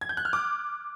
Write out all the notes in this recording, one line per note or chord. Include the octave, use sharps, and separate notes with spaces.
G#6
G6
F#6
F6
D6